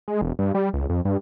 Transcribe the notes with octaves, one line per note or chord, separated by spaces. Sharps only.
G#3
E1
G2
G3
C#2
F2
G2